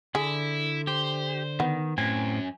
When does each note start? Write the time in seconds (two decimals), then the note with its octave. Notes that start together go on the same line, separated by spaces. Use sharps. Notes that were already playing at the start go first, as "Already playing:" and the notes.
0.15 D3 E4 G#4
0.87 G4 C5
1.60 D#3 B3
1.98 F#2 A2 C4 G#5